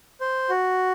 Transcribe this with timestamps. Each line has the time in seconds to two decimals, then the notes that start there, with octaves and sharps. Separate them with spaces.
0.20 C5
0.49 F#4